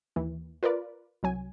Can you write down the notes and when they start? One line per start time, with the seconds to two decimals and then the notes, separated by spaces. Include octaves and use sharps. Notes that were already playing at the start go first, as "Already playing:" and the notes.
0.16 D#2 E3
0.63 F4 A#4 B4 D5
1.23 C2 F#3 G#5